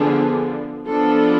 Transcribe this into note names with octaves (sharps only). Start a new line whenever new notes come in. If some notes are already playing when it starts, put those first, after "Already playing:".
Already playing: D3 F3 B3 D4 G#4
F3 B3 D4 A4